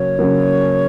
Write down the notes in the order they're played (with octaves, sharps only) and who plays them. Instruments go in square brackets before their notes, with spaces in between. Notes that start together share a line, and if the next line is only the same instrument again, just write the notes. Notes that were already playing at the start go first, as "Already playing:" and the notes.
Already playing: [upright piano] C#3 F#3 A#3 [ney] C#5
[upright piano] C#3 F#3 A#3